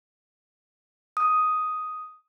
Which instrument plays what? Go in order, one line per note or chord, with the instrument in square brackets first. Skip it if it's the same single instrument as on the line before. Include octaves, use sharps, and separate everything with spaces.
[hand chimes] D#6